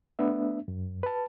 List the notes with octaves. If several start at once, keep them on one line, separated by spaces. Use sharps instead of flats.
A3 B3 D4 E5
F#2
B4 A5